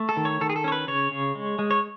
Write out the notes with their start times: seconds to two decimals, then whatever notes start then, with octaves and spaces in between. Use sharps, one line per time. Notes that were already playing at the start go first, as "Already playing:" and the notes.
Already playing: A3
0.09 A4
0.17 D#3
0.25 C#5
0.41 D#3 A4
0.49 G#4
0.56 A4
0.64 C#4 C#5
0.72 B4
0.87 C#3 C#5
1.11 C#3
1.35 G#3
1.59 G#3
1.71 C#5